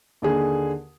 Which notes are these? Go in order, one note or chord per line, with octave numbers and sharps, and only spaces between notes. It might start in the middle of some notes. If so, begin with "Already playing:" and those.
D#2 D3 G#4